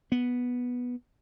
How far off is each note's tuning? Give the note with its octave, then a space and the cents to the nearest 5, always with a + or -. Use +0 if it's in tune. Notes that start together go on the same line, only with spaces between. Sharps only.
B3 -5